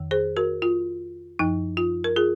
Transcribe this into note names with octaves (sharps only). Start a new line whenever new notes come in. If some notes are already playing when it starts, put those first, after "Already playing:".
Already playing: F2 D#3
G#4 C5
F#4 A#4
F4
F#2 F3 D#4
F4
A#4
F4 G#4